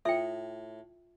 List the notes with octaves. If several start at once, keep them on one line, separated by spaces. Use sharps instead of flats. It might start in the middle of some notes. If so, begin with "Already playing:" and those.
A2 F4 E5 G5